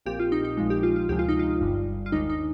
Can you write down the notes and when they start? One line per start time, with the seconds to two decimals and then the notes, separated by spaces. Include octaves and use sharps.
0.06 A#1 A#2 F3 C4 G4
0.19 F4
0.32 D#4
0.45 D#4
0.57 A#1 A#2 F3 G#3 D#4
0.70 G4
0.83 F4
0.96 F4
1.09 D2 C3 F3 G#3 G4
1.19 F4
1.28 D#4
1.39 F4
1.61 G1 G2 D3 G3
2.06 F4
2.12 D#2 D#3 G#3 D4 D#4
2.30 D#4